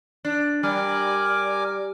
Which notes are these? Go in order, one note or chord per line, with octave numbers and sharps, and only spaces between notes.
D4
G3 A#4 G#5 D6